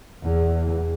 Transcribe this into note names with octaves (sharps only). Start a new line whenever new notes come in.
E2 E3